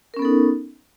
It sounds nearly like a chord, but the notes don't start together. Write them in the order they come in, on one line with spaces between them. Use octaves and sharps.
A#4 C#4 B3 A4 D#4